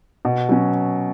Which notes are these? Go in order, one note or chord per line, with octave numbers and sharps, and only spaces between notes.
B2
F#3 C#4